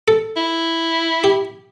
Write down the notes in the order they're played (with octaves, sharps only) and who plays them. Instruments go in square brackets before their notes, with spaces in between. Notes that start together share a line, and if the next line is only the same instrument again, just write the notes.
[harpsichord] A4
[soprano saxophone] E4
[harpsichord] G4